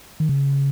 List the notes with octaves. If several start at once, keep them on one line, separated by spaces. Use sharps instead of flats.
D#3
C#3